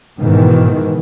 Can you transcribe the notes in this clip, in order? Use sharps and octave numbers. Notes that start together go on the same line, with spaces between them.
G#2 B2 D#3 E3